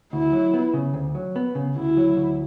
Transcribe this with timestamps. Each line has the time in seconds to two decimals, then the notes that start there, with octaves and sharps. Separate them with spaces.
0.13 D2 E4
0.32 F#3
0.54 B3
0.74 C#3
0.94 D2
1.15 F#3
1.36 B3
1.55 C#3
1.76 D2 E4
1.97 F#3
2.17 D2